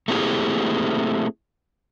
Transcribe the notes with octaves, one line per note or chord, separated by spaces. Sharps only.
A3 A#3 C4 E4 G4 G#4